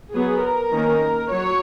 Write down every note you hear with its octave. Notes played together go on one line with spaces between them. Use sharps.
F#3 B3 G#4
A#4
D#3 A#3 C#4
F#3 C#5